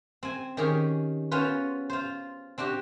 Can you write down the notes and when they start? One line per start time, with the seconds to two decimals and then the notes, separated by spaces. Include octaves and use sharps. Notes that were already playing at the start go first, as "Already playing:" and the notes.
0.23 C4 G#5
0.57 D#3 C#4 G4 G#4
1.31 B3 C#4 F4 B4 C5
1.90 F4 C5
2.58 C4 D4 F#4 G4